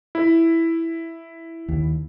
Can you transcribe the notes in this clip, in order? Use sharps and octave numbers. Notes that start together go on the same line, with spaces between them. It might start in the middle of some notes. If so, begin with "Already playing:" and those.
E4
D#2